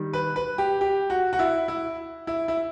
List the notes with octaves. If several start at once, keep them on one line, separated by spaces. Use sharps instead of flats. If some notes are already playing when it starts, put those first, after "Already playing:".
Already playing: D#3 G3
B4
B4
G4
G4
F#4
F#4
E4
E4
E4
E4